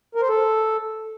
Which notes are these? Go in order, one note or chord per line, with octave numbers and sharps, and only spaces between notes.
A#4
C5
A4